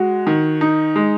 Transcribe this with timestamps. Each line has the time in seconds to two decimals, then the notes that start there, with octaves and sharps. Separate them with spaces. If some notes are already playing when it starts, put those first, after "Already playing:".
Already playing: G#3 F#4
0.27 D#3
0.61 D#4
0.96 G#3